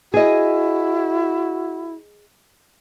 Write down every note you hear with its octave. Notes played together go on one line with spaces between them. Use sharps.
E4 F#4 G#4 D#5